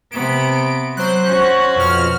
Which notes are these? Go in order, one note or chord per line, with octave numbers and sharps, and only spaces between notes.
C3 B3 D7
F#3 C5 F#6
C#4 F#4
F2 B2 F6